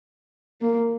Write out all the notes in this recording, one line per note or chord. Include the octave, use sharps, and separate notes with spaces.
A#3